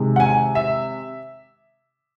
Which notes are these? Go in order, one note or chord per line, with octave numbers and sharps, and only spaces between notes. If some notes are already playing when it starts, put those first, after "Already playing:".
Already playing: C3 D#3 G#3
F#5
G#5
E5